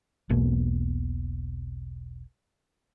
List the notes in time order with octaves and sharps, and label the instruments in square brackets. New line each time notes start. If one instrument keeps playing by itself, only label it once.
[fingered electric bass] E1 B1 B2 A#3